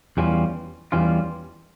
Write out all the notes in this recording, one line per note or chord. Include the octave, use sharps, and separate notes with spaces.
E2 E3 G3 C#4 F4
E2 E3 G3 C#4 F4